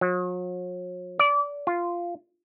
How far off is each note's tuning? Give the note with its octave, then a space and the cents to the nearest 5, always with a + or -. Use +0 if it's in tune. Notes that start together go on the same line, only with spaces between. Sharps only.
F#3 -45
D5 -25
F4 -5